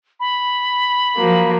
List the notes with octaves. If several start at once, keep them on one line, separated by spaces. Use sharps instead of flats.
B5
F3 F#3 A#3